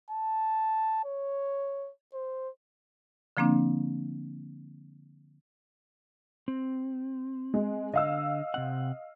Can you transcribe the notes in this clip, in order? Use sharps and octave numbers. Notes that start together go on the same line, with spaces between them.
A5
C#5
C5
D3 F3 A#3 C4 D4
C4
G#3
D3 D#5 F5 E6
C3 C4 F#5